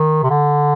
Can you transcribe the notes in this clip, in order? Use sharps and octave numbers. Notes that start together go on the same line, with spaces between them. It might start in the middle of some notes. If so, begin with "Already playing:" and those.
Already playing: D#3
C3
D3